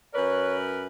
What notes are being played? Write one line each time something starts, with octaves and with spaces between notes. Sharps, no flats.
F#2 A#4 B4 C#5